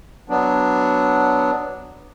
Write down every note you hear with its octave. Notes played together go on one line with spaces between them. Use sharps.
F#3 B3 D4